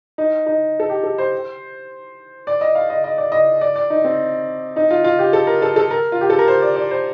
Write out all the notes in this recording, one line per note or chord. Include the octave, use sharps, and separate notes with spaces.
D#4
D#4
A4
G4
A4
C5
D5
D#5
F5
D#5
D#5
D5
D#5
D5
D5
D#4
C4
D#4
F4
F4
G4
A4
A#4
A4
A4
A#4
F4
G4
A4
A#4
C5
D5
D5
C5